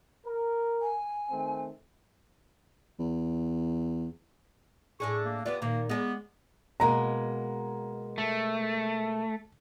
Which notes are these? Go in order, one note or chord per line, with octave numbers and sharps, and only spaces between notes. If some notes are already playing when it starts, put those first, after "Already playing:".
A#4
G#5
D#3 A3 C4
E2
A2 D4 G#4 C#6
A#3
G3 B3 F4 D5
A#2 D#3 A#3
G#3 B3 G#4 D5
B2 G#3 A#3 A#5
A3